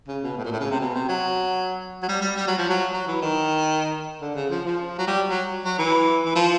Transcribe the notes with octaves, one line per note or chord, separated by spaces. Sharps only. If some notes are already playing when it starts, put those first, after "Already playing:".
C#3
B2
A2
A#2
A2
C#3
C3
B2
C3
F#3
F#3
G3
G3
G3
F#3
F3
F#3
F#3
E3
D#3
D3
C#3
F3
F3
F#3
G3
F#3
F#3
E3
E3
F3